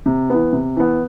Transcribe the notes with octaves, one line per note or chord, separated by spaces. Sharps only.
C3
E3 B3
C3
E3 B3